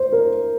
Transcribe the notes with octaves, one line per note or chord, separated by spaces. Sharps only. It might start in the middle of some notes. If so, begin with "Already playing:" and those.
Already playing: C5
A#4